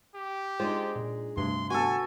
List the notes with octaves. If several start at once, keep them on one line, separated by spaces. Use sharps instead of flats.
G4
G#3 D4 D#4 F4 C5
A#2
D2 G2 C3 C6
B3 F#4 A4 G#5